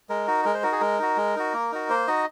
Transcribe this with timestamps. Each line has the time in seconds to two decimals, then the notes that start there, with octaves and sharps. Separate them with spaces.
0.09 G#3 A#4
0.28 D#4 F#4
0.45 G#3 A#4
0.54 C5
0.63 D#4 F#4 A#4
0.72 G#4
0.81 G#3 A#4
0.99 D#4 F#4
1.17 G#3
1.36 D#4 F#4
1.54 A#3
1.72 D#4 F#4
1.89 A#3 C5
2.07 D#4 F#4 D#5